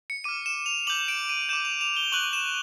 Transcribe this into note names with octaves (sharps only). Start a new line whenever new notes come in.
C#7
D6 F6 D#7
E7
F7
D6 G6 F#7
D7
D#7
D6 G6 E7
F7
F7
G7
C#6 F#6 F#7
E7